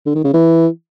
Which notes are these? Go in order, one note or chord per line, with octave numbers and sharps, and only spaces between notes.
D3
D#3
C#3
E3